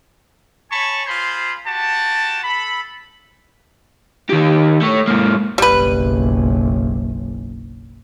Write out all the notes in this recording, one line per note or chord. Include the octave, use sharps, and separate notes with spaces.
C#5 G#5 A5 B5 C#6
F4 G#4 C5 B5 C6
F#4 G4 A5
A4 B5
D#3 G4
A3 C#5
G#2 A#3
F#1 B1 G3 B4